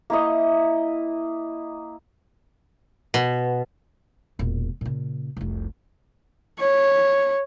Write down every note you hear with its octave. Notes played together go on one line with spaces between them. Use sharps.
A#3 E4 D#5
B2
E1 A#2
A#2 C#3
F1 C2
C#5